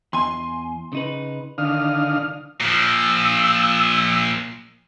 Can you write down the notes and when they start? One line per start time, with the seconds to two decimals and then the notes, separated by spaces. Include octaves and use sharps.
0.13 E2 G#5 C6
0.93 C#3 D#4 B4
1.58 D3 D#3 D4 F5 D#6 F6
2.60 A#2 F3 E6